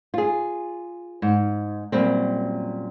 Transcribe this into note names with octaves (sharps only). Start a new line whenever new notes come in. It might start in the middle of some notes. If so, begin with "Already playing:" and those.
F4 G#4
G#2
F#2 A#2 G3 C4